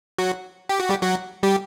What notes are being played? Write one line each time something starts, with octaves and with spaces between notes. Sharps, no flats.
F#3 F#4
G4
F#4
G3 G4
F#3 F#4
G3 G4